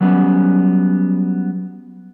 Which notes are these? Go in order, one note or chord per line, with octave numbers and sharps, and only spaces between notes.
F#3 G3 B3 C#4